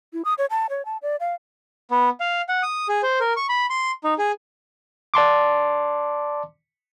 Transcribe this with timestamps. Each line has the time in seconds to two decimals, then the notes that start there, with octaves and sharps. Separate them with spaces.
0.13 E4
0.25 D#6
0.38 C#5
0.50 A5
0.70 C#5
0.85 A5
1.02 D5
1.20 F5
1.90 B3
2.20 F5
2.49 F#5
2.63 D#6
2.89 G#4
3.03 C5
3.20 A#4
3.36 C#6
3.49 B5
3.70 C6
4.04 D#4
4.18 G#4
5.14 D5 A5 C6 D6